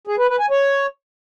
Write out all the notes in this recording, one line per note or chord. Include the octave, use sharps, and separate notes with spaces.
G#4
B4
B4
G#5
C#5